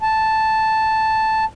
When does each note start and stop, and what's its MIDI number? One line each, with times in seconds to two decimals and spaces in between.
0.01 1.45 81